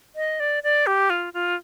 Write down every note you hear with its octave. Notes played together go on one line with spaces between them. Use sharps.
D#5
D5
D5
G4
F4
F4